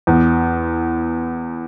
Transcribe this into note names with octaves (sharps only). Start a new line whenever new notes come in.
E2